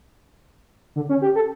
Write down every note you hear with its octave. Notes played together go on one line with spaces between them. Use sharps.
D3
C#4
G4
A4